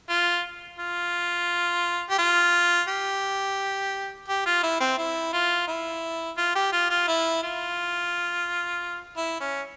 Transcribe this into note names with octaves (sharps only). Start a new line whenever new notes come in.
F4
F4
G4
F4
G4
G4
F4
E4
C4
E4
F4
E4
F4
G4
F4
F4
E4
F4
E4
C#4